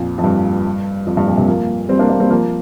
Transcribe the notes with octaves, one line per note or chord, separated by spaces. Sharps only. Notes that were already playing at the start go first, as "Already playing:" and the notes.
Already playing: F2 A#2
F2
G2
F2
G2
F2 A#2
G2 C3
F3 A#3
G3 C4
A#3 D4
A#3 D4
G3 C4
F3 A#3